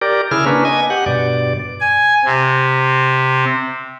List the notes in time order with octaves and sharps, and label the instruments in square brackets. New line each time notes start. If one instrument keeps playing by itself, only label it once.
[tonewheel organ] G4 A#4 D5
C#3 E4 G#4 F6
A#3 C#4 D4 B4
D#5 G#5
G4 F#5
G2 B2 D5
[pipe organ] G#5
C3